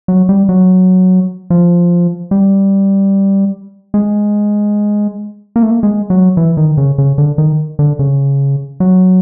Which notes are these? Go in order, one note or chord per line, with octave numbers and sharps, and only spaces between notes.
F#3
G3
F#3
F3
G3
G#3
A#3
A3
A#3
G#3
F#3
E3
D#3
C#3
C#3
D3
D#3
D3
C#3
F#3